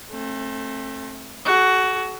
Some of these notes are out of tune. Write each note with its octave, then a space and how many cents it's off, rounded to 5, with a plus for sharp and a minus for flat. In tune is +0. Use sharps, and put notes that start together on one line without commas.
A3 +0 C4 +40
F#4 +15 A4 -45